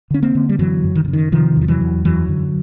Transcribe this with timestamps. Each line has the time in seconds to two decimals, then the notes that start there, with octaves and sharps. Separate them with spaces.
0.11 D3 C#4
0.22 A#3 C4
0.35 D3
0.49 G3
0.59 F#2 E3 F#3
0.84 F#2
0.95 D#3
1.05 D3
1.08 C#3
1.13 D#3
1.32 C3 D#3 F3
1.56 E2 F3
1.68 E3 F#3
1.81 E2
2.05 F#2 E3 F#3
2.29 D3